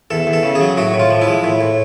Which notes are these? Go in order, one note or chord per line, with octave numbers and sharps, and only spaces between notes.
E2 A4
E2
A4
C#3
G#4
F#3
A2 F#4
A2
F4
F3
E4
G#3
A2
A2